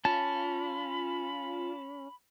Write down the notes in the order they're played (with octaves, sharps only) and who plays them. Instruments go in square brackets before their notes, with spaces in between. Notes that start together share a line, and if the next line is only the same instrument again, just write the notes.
[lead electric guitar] C#4 [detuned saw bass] F4 [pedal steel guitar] A5 [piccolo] B5